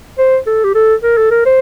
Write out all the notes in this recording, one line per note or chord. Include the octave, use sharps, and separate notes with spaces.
C5
A4
G4
A4
A#4
A4
A#4
C5